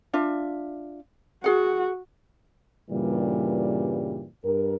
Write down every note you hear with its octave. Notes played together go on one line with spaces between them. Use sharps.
D4 F4 E5
F#4 G#4 F#5
G2 A#2 C#3 E3 G3
G2 A#4